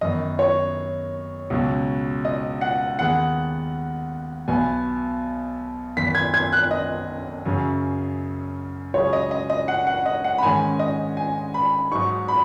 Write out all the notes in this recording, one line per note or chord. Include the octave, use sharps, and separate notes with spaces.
F#2 D#3 B3 D#5
C#5
C#2 B2 F#3 C#4
D#5
F#5
D#2 D#3 B3 G#4 F#5
B1 B2 B3 G#5
F#2 D#3 B3 B6
G#6
G#6
F#6
D#5
F#2 C#3 F#3 C#4
C#2 C#3 F#3 C#4 G#4 C#5
D#5
D#5
D#5
F#5
F#5
D#5
F#5
B5
G#2 D#3 G#3 C#4 G#5
D#5
G#5
B5
G#2 F#3 D#4 C#6
B5